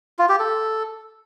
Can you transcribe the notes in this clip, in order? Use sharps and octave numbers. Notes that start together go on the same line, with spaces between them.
F4
G4
A4